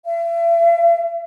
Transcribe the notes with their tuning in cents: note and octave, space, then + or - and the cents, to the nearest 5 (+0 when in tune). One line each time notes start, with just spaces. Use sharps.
E5 +40